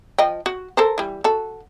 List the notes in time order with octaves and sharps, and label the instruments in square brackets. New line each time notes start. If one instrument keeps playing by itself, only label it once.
[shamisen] F3 D#5 G5
F#4
A4 A#4 C5
E3 G3
F#4 A4